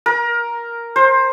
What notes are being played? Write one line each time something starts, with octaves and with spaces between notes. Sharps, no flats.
A#4
C5